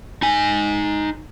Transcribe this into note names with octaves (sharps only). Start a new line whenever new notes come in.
D#4 G#5